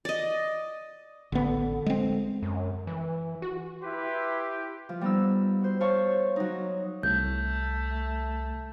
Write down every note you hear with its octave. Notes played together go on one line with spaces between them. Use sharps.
D5 D#5
A1 D3 B3
G#3 C4
F#2
E3
F#4
E4 G4 B4 C6
F3
G3 B3 D#4 E6
F#4 C5
C5 C#5 F5 A5 C#6
F#3 D#4
C2 A3 G6